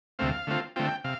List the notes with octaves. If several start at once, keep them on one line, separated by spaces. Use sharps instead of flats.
D2 C3 A3 C4 F5
D3 A3 C4 F4
D3 A3 C4 F4 G5
C3 F5